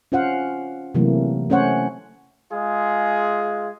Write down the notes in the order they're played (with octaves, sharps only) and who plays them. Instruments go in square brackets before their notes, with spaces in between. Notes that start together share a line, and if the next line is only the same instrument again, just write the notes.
[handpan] C#4 F4 C5 F5 F#5
C3 E3 F#3 A3 A#3
A3 C#4 C5 C#5 F#5
[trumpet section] G#3 F4 G#4